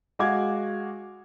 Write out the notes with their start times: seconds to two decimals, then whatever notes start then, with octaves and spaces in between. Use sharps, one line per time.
0.19 G#3 F#4 F5 D6 G#6